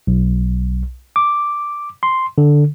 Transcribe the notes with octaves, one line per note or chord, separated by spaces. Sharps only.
B1
D6
C6
D3